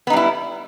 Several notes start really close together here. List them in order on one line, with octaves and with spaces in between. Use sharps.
B3 D#4 G3 E4